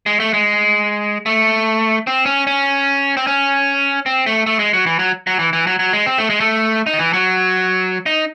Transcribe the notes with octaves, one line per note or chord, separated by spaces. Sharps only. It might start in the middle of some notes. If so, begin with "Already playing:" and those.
G#3
A3
G#3
A3
C4
C#4
C#4
C4
C#4
C4
A3
A3
G#3
F#3
E3
F#3
F#3
E3
E3
F#3
F#3
G#3
C4
A3
G#3
A3
D#4
D#3
E3
F#3
D#4